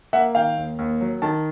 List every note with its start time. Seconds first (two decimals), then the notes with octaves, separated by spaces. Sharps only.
0.13 A#3 E5 F#5
0.35 D#3 F5 G5
0.57 D#2
0.79 D#2
1.01 F#3
1.22 D#3 A5